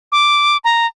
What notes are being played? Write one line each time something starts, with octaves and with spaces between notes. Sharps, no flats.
D6
A#5